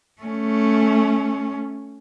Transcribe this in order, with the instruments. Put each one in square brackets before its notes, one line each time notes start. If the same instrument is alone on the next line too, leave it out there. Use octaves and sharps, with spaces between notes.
[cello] A3 C#4